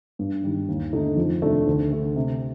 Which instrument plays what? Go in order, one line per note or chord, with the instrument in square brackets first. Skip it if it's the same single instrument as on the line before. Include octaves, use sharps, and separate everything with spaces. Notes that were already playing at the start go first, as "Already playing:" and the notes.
[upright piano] G2
D#3 G3
D#2
D3 A3 D#4
F2
C3 D#3 A3 D4
D2
D3 A3
C3